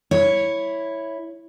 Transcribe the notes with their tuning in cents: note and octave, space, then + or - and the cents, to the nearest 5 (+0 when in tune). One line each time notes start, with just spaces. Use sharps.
E4 +0 C#5 +0